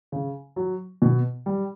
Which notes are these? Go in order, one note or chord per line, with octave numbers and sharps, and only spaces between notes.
C#3
F#3
B2
G3